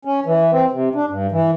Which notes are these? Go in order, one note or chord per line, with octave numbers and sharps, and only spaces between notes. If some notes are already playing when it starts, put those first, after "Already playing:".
C#4
E3
C4
C3
D4
G2
E3